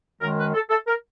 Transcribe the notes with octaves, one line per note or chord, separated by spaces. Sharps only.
F#2 D#3 G#3 A#4
B4
A4
A4
A#4